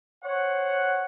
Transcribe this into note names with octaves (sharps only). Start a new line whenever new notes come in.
C5 C#5 F#5